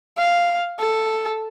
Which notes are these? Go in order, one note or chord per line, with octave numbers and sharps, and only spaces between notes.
F5
A4